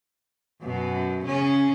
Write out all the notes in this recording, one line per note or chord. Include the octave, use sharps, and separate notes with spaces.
F#2 B2
C#3 C#4